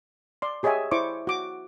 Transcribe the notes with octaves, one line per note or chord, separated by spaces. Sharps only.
D5 C6
G4 G#4 C#5 D#5 E5 G#5
E4 C5 D5 C#6 D6
F#4 D6